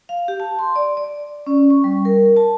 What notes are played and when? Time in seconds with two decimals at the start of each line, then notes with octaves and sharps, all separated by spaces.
0.09 F5
0.28 G4
0.40 A5
0.59 C6
0.76 D5
0.97 D5
1.46 C#4
1.70 C#6
1.84 G3
2.05 A#4
2.36 A5